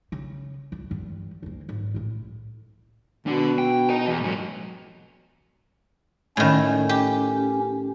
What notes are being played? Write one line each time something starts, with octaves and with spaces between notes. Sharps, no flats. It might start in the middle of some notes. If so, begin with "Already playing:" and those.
C#3
C#2
E2 G2
D2 A#3
G#1
C2 A2
B2 D4 F#5
G5
D#5 A#5
E2
G#2 F#3
A2 D#3 C#4
G4